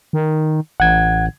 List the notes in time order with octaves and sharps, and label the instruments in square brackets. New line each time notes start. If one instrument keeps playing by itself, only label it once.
[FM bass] D#3
[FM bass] A1 [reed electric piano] F#5 G#6